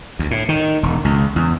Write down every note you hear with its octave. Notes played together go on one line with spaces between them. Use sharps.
D2
A2
D#3
E1
C#2
E2